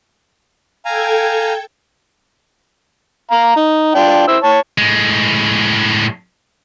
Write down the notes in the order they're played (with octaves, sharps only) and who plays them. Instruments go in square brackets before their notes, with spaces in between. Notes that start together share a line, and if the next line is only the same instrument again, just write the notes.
[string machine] A4 G5 G#6 [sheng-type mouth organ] F5 G#5 A#5
[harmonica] F5 A#5
D#4
D4 F4 G5
E4 C5 E6
C#5 A5
[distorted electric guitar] A2 G#3